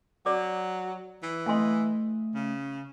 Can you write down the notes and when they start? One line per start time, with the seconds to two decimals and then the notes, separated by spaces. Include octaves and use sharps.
0.26 F#3 D5 D6
1.23 E3
1.46 A3 D#5 F5 G#5 C6
2.35 C#3